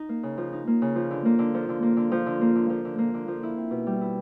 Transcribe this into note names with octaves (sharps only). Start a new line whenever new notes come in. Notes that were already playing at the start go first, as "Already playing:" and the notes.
Already playing: D#4
A#3
C#3
F3
D#4
A#3
C#3
F3
D3
A#3
D3
F3
D3
A#3
D3
F3
D3
A#3
D3
F3
D3
A#3
D3
F3
E4
C4
B2
G3
E4